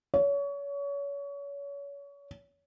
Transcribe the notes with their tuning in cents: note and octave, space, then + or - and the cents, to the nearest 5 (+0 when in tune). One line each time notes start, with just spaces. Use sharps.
C#5 +30